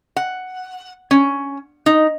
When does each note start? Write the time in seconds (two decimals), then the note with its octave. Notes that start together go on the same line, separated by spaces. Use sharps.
0.16 F#5
1.11 C#4
1.86 D#4